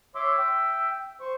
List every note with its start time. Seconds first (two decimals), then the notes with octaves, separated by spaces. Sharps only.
0.15 C#5 E5 C6 D6
0.39 G5
1.21 C5 C#6